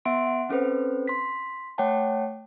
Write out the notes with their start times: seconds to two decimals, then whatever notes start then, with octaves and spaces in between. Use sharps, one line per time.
0.05 B3 E5 F#5 C6 D7
0.27 F#5
0.49 C4 C#4 A4 B4 C5
1.08 C6 B6
1.78 A3 C#5 F#5 G5 A5